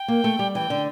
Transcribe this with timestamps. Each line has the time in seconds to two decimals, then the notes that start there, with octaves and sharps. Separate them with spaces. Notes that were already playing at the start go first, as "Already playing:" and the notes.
Already playing: G5
0.08 A#3
0.24 A3
0.39 G3
0.54 E3 G5
0.70 D3